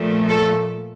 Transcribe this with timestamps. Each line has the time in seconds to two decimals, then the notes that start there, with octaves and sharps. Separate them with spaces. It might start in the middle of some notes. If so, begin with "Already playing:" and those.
Already playing: A#2 F3 A3
0.27 A4